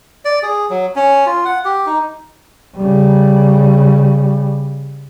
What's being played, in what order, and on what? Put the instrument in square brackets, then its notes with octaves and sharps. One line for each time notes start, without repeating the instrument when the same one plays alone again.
[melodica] D5
G#4
F#3
C#4
F4
F#5
G4
D#4
[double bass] C#3 G3